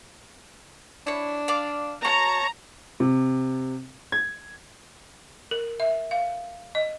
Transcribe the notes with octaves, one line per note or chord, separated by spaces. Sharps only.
D4 E4 C#5
D5 F5 D6
F#4 C#5 A5 A#5 C#6
C3
G#6
A#4
E5
F5
D#5